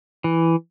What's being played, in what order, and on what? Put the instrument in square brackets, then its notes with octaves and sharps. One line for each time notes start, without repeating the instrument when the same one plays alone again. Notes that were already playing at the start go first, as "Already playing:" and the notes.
[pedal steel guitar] E3